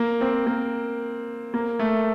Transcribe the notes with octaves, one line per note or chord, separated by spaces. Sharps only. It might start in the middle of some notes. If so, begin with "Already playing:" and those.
Already playing: A#3
C4
A#3
A#3
A3